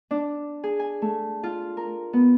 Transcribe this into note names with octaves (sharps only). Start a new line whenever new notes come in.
D4
G#4
G#5
A3
F4
A#4
B3